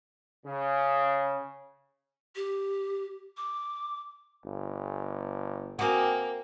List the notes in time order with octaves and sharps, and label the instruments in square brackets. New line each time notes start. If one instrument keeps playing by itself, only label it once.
[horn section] C#3
[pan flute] G4
D6
[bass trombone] G1
[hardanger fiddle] A#3 [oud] C4 F#4 [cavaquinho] G#5 D6 D#6